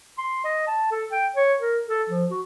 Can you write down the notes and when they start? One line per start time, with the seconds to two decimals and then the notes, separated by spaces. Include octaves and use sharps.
0.18 C6
0.44 D#5
0.67 A5
0.91 A4
1.12 G5
1.35 C#5
1.61 A#4
1.88 A4
2.09 F3
2.31 F#4